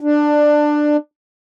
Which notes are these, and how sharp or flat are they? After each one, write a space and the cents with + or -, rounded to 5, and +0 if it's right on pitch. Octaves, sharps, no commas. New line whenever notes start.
D4 +15